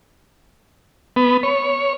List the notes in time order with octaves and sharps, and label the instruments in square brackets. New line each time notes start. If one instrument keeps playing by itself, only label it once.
[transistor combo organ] B3
C#5